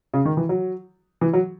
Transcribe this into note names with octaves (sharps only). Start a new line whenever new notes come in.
C#3
D#3
E3
F#3
E3
F#3